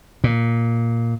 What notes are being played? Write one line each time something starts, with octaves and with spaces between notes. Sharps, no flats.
A#2